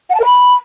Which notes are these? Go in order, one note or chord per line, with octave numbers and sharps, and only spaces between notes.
F#5
A5
A#4
B5